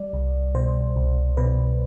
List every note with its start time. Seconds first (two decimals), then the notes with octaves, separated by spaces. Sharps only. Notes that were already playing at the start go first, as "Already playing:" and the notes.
Already playing: G3 D5
0.13 C2
0.55 B2 C5
0.96 C2
1.37 B2 B4